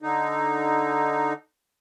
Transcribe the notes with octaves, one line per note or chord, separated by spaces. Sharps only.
D3 D#4